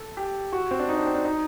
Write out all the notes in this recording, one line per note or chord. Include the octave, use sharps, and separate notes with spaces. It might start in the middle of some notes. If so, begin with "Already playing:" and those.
Already playing: A4
G4
F#4
C4
D4
D#4
D4
C4
D4
D#4